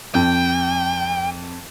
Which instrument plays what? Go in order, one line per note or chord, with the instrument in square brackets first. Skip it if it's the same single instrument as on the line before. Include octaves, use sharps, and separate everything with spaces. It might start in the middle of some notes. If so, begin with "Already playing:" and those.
[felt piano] F2 [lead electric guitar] G5